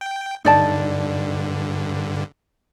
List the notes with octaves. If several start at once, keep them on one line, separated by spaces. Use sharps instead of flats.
G5
G2 D3 D#4 D5 A5